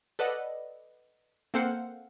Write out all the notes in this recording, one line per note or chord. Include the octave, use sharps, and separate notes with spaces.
A4 B4 D5 D#5 F#5
A#3 C4 A4 C5 F5 F#5